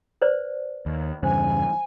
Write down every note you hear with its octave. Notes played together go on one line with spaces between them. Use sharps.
B4 C5 D5
D#2
E2 G2 C#3 C5 G#5